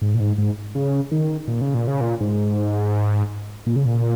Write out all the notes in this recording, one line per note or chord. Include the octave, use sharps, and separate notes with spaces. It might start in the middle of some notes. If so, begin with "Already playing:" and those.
G#2
A#2
G#2
G#2
C#3
D#3
A#2
C#3
A#2
C#3
A#2
G#2
A#2
C#3
A#2